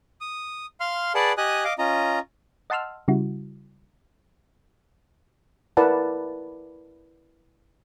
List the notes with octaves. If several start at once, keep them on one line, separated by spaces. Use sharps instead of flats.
D#6
F5 C6 F6
G#4 B4 D5 F#5 A5
G4 D#5 G#5 D#6 F#6
D#5 F5 D6
C#4 F4 D#5 A#5
D#5 F#5 A5 C6 E6 F6
C#3 G3 E4 F#4
E4 A#4 B4 D5 F#5 A5